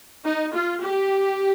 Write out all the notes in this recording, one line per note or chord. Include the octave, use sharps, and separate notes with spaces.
D#4
F4
G4